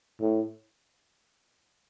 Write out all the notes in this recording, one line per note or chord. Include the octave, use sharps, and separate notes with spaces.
A2